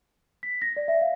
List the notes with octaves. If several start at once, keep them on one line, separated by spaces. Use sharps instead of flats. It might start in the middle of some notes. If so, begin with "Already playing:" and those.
B6
A#6
D5
E5
F5